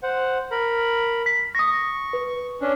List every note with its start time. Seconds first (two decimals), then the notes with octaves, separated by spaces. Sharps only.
0.03 C5 F#5
0.51 A#4 B5
1.26 B6
1.55 C#6 D#6 A#6
2.13 B4
2.61 C#4 D4